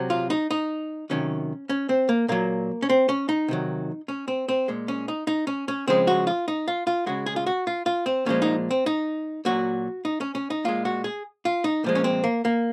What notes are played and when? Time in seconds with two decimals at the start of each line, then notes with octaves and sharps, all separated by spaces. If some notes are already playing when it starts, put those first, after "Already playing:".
Already playing: C3 F#3
0.10 F4
0.30 D#4
0.51 D#4
1.10 C3 D#3 F#3 C#4
1.69 C#4
1.89 C4
2.09 A#3
2.28 A#2 F#3 A#3
2.82 C#4
2.89 C4
3.09 C#4
3.29 D#4
3.48 C3 D#3 F#3
4.08 C#4
4.28 C4
4.48 C4
4.68 A#2 G#3
4.88 C#4
5.08 D#4
5.27 D#4
5.47 C#4
5.68 C#4
5.88 C#3 F3 G#3 C4
6.07 F#4
6.27 F4
6.48 D#4
6.68 F4
6.87 F4
7.06 C#3 G#3 F#4
7.26 G#4
7.36 F4
7.46 F#4
7.67 F4
7.86 F4
8.06 C4
8.26 A#2 F3 G#3 C#4
8.42 D#4
8.71 C4
8.86 D#4
9.45 A#2 F#3 F#4
10.05 D#4
10.21 C#4
10.35 C#4
10.50 D#4
10.65 A#2 G#3 F4
10.85 F#4
11.04 G#4
11.45 F4
11.64 D#4
11.84 A#2 F3 G#3
11.95 C#4
12.04 C4
12.24 A#3
12.45 A#3